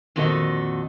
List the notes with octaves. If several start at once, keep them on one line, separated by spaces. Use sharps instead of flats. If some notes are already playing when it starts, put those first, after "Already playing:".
F2 A#2 D#3 F#4 A4 D#5